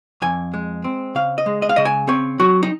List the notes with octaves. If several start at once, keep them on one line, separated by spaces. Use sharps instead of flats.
F2 G#5
G#3
C4
C#3 F5
D#5
G#3
D#5
F5
C#3 D#5
G#5
C4 C#5
F#3 F#4
D#4